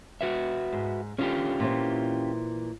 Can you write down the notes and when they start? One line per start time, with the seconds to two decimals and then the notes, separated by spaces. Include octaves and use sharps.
0.21 F#4 B4 E5
0.73 G#2
1.18 D3 B3 C#4 F4 G4
1.60 A#2 E3 C4